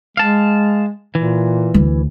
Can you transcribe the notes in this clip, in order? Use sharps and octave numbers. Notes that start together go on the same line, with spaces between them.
G#3 F5 A5
A#2 E3
D2